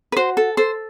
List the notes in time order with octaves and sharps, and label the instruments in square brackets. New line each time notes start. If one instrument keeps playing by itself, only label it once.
[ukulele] B4
F#4 C5
A4
A4 C5